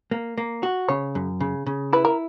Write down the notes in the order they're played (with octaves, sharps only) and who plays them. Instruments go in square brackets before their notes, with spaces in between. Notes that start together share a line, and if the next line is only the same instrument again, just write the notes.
[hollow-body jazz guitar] A#3
A#3
F#4
[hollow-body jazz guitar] C#3 [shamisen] C#5
[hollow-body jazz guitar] F#2
C#3
C#3
[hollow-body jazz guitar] E4 [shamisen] B4
[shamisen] A#4